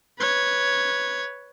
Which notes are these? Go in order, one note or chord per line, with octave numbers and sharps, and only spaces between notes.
B4 C#5